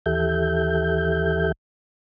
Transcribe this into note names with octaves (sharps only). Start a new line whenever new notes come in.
D#2 E3 G4 A4 E5 G6